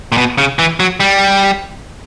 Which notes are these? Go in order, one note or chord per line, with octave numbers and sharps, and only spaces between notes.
A#2
B2
C#3
E3
F#3
G3